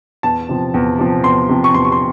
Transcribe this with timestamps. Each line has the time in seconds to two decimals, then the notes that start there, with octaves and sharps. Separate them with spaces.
0.23 E2 A5
0.49 C3 F3
0.74 E2
0.99 C3 F3
1.24 E2 C6
1.49 C3 F3
1.64 C#6
1.74 E2 C6
1.85 C#6
1.92 C6